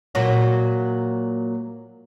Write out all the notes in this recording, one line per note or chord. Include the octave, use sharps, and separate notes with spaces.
A#2 F#3 F#4